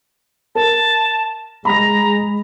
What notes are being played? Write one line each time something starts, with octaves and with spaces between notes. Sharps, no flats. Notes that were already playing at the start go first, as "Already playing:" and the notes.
A#4 A5
G#3 A#5 B5 A#6